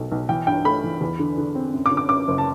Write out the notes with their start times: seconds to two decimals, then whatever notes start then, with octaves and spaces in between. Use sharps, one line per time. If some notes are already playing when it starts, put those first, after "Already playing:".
Already playing: B1 A3
0.12 B1
0.29 E3 G5
0.47 G2 G5
0.65 A3 B5
0.84 E3
1.01 E2
1.19 D3
1.38 D3
1.55 C4
1.74 F#2
1.86 D6
1.91 D3
1.97 D6
2.09 F#2 D6
2.28 F#1
2.38 A5